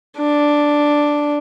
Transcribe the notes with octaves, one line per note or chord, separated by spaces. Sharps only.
D4